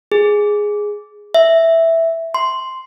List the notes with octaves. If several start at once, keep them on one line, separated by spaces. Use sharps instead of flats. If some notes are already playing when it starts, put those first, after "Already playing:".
G#4
E5
C6